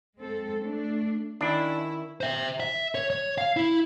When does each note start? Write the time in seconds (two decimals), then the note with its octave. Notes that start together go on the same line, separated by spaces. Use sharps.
0.16 G#3 C4 A4
0.59 A3 D4
1.41 D#3 C#4 D4 E4
2.21 C5 E5
2.60 E5
2.95 C#5
3.10 C#5
3.38 F5
3.57 E4